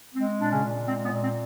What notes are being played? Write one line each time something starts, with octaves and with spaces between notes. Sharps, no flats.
G#3 C4
A#2 D4
C#3 C#4
A#2
G#3 C4
B3
A#2
C4